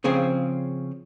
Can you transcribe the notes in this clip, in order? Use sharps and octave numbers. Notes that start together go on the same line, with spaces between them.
C#3 F3 C4 G#4